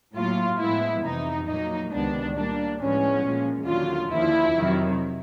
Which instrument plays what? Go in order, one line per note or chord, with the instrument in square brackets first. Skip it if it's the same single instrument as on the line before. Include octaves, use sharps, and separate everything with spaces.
[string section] A2 F#3 A#3 F4
A2 F3 G#3 B3 E4
F2 C3 E3 D#4
A#2 F#3 A#3 D#4
C#2 C3 D#3 G#3 B3 D4
A#2 G3 A#3 D4
A2 F3 G#3 B3 C#4
A#2 F3 G#3
D#2 D3 F#3 F4
D#2 D3 F3 E4
F2 C3 D#3 F#3